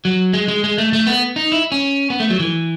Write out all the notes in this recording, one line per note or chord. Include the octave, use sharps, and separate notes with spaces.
F#3
G#3
G#3
G#3
A3
A3
B3
D#4
E4
C#4
B3
A3
F#3
E3